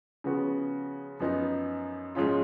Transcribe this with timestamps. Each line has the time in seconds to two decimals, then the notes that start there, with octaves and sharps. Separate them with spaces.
0.24 C#3 F3 B3 F#4
1.20 F#2 F3 B3 D#4
2.15 G#2 F3 G#3 C#4 F4